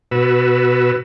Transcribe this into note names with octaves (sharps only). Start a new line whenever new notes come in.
B2 F#4 B4 E6